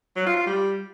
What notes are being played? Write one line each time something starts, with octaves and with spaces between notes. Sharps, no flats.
F#3
F4
F4
G3